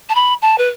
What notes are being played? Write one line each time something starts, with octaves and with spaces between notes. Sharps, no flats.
A5
B5
A5
B4